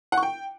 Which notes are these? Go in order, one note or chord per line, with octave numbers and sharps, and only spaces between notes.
F#5
C#6
G5